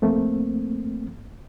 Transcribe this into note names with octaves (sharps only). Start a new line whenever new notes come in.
F2 A3 A#3 C4